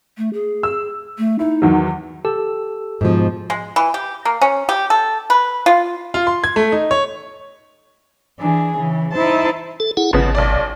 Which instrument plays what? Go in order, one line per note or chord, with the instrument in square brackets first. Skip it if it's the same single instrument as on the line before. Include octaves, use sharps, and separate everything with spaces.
[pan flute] A3
G#4
[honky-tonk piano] E6
[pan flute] A3
[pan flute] D#4 [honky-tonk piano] E4
[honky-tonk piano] E2 D#3 F#3
[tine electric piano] G4 A4 E6
[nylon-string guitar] G#2 B2 F3
[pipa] G#3
E3
G4
A#3
C#4
G4
A4
B4
F4
[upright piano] F4
C6
G#6
A3
D#4
C#5
[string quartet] E3 D4 G#4
C#3 E3
D#4 E4 C5 A5
[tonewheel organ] A4
E4 G#4 F#5
[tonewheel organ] G#1 [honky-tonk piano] C#3 F3 B3
[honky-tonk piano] B1 D5